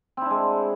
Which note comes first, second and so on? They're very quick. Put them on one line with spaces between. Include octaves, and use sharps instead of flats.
C4 E4 D4 G#3